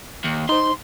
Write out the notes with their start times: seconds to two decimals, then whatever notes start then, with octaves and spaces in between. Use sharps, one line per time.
0.24 D#2
0.49 D#4 C5 C6